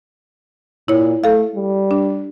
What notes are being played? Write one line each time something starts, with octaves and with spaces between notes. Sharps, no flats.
A#2 E4 C#5
A3 A4 F5
G3
D4